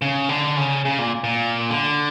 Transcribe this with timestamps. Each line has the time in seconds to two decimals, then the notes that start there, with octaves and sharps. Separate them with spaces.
0.02 C#3
0.29 D3
0.57 C#3
0.85 C#3
0.99 A#2
1.24 A#2
1.70 D3